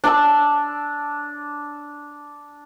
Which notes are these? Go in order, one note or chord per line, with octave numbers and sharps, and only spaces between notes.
D4 A5 E6